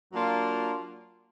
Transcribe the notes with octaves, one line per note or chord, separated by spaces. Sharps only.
F#3 A#3 D4 F4